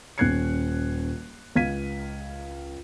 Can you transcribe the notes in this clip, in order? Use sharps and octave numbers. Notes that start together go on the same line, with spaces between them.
D#1 C#4 F#6 G#6 C7 C#7
C#2 F5 G#6 B6 D#7